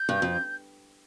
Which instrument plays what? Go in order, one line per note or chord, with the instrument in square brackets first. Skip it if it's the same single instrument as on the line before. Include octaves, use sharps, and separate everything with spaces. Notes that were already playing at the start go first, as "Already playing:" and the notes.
Already playing: [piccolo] G6
[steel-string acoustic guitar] G2
F2